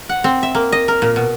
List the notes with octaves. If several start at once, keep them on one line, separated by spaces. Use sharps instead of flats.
F#5
C4
E5
A#3
D#5
A#4
A#2
B2